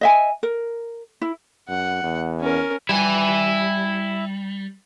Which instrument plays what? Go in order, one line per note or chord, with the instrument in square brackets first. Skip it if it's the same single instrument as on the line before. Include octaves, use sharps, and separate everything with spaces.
[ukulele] D#5 E5 G#5
A#4
E4
[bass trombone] F#2 [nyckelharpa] F#5
[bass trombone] E2
[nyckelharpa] C#4 A#4
[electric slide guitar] G3 [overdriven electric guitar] E4 G#5